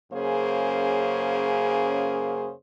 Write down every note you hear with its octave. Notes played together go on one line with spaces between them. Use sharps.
F#2 C#3 A#3 C#4 G#4 C5